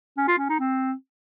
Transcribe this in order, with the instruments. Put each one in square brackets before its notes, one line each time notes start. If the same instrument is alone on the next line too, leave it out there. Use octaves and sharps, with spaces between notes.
[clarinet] C#4
F4
C#4
D#4
C4